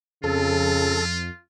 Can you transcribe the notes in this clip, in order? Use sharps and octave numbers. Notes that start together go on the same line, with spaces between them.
F2 C#3 F4 A4